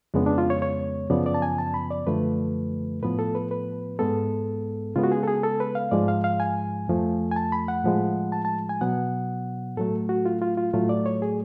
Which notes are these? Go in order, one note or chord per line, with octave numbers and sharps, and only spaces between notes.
F2 C#3 G#3 B3 D4
D4
F4
C#5
C#5
F#2 C#3 F3 B3 D5
D5
A5
G#5
A5
B5
D5
F#2 D3 F3 A3 B4
A2 F3 B3 B4
A4
B4
B4
G#2 G#3 B3 A4
C#3 G#3 B3 F4
F#4
G#4
A4
G#4
A4
B4
F5
G#2 F3 G#3 D5
F5
F5
G#5
F2 F3 A3
G#5
A5
B5
F#5
A2 F3 G#3
A5
A5
G#5
B2 F#3 B3 F#5
A2 F#3 A3 A4
F#4
F4
F4
F4
A2 F#3 A3 F4
D5
C#5
G#4